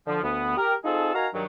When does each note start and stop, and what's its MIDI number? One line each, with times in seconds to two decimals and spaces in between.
0.07 0.19 50
0.07 0.19 53
0.23 0.57 38
0.23 0.57 59
0.57 0.74 67
0.57 0.74 70
0.85 1.13 60
0.85 1.13 63
0.85 1.13 65
0.85 1.13 68
0.85 1.13 69
1.14 1.27 63
1.14 1.27 66
1.14 1.27 70
1.14 1.27 77
1.14 1.27 80
1.14 1.27 82
1.34 1.45 43
1.34 1.45 51
1.34 1.45 54